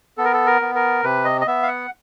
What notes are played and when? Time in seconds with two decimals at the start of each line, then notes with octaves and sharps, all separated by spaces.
0.18 B3 A4
0.25 A#4
0.33 A4
0.46 A#4
0.62 B3
0.75 A#4
1.04 C3 B4
1.25 D#5
1.41 D#5
1.47 B3 E5
1.63 F5
1.68 F#5